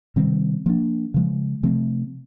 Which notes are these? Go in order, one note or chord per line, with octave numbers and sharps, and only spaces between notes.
C3 D#3 G3 C4
F3 A#3 D4
C#3 F3 G#3
C3 F3 A3 C4